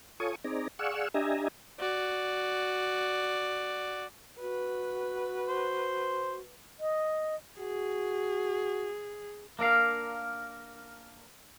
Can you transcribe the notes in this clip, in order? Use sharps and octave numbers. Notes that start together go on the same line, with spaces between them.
F4 A4 C#5 G#5 C#6 D#6
C4 D#4 G#4 D5 A#5
G#4 D5 F5 F#5 C#6 E6
D4 G4 D#5 E5 G#5 A#5
F#4 D5
F#4 B4
C5
D#5
F#4 G#4
A#3 D4 A#4 F5